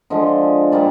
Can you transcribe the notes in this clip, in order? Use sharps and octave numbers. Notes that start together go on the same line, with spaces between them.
D3 F3 G#3 D#5
A#2 G3 A#3 D5